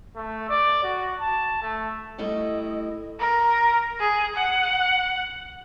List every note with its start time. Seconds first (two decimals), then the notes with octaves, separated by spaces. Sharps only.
0.16 A3
0.49 D5
0.84 F#4
1.20 A5
1.62 A3
2.18 G3 A3 E4 D#5
3.19 A#4
4.00 G#4
4.36 F#5